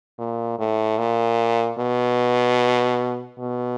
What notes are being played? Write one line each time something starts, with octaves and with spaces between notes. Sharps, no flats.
A#2
A2
A#2
B2
B2